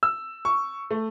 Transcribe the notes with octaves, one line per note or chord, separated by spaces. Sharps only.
E6
C#6
A3